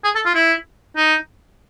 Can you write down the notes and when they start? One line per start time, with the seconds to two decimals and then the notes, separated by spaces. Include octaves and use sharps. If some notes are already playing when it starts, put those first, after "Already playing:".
0.04 G#4
0.15 A4
0.25 F4
0.35 E4
0.96 D#4